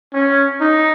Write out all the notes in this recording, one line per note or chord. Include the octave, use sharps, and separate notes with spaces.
C#4
D#4